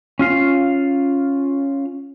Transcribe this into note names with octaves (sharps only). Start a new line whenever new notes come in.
C#4 F4 F5